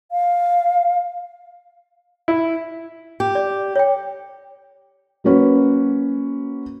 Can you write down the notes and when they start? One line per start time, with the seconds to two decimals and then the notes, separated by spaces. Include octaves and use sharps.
0.12 F5
2.28 E4
3.20 G4
3.35 D5
3.76 C#5 G5
5.24 F#3 A#3 C#4 F#4 B4